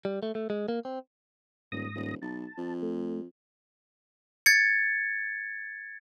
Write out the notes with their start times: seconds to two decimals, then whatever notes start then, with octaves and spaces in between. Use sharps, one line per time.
0.05 G3
0.23 A3
0.35 A3
0.50 G#3
0.68 A#3
0.85 C4
1.72 D#1 G#2 D#6 A#6
1.95 D#1
2.22 B1 A5
2.57 F2
2.82 A3
4.46 G#6 A6 C#7